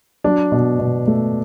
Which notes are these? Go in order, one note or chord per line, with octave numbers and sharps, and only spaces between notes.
F#3 D4
B2
B2
A3